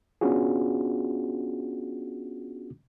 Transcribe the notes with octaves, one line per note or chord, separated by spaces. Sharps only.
B3 C#4 D4 F4 F#4 G#4